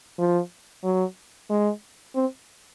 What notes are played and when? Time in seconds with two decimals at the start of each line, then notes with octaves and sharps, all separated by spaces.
0.19 F3
0.84 F#3
1.50 G#3
2.15 C4